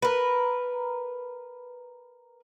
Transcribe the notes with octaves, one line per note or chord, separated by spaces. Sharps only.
A#4 B4